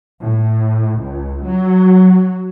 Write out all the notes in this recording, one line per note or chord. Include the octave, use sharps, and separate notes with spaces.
A2
C#2
F#3